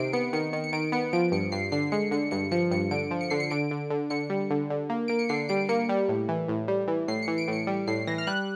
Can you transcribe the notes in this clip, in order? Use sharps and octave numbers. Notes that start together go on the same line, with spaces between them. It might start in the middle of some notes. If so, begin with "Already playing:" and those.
Already playing: C3 D#3 C7 D7
B3 C#7
D#3 C#7
D#3 C#7
C#7
D#3 D7
B3 C#7
F3 D7
G2 C#7
G2 C7
D3 C7
G#3 C#7
D3 C#7
G2 C#7
F3 C#7
G2 C#7
D3 D7
F3
C#7
D3 C7
C#7
D3 D7
D3
D3
D3 C#7
G3
D3
D3
A#3
A#3 D7
C#7
D3 C7
G3 D7
A#3 C#7
G3
A2
E3
A2
G3
E3
A2 C7
C#7
E3
D7
A2 C#7
G3
A2 C7
E3 A#6
F6
G3 F#6